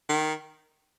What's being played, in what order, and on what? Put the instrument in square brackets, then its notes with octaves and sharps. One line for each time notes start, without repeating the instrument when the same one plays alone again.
[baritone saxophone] D#3